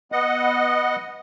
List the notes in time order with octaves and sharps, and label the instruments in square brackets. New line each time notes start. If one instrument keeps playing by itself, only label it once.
[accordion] B3 D#5 F#5